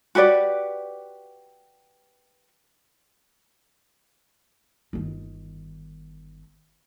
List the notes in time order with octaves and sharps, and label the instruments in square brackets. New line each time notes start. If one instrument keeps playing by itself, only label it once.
[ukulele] F#4 G4 B4 D5
[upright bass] G1 D#3